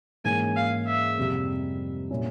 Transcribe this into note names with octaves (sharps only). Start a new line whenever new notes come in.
G#2 E3 A#3 C#4 E4 G#5
F5
E5
F2 C3 G3
A#2 G3 C#4 E4